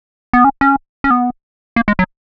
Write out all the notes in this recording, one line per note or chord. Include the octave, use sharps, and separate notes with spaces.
B3
C#4
C#4
C#4
B3
A#3
G#3
F#3